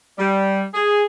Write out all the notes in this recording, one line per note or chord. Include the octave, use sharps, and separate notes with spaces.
G3
G#4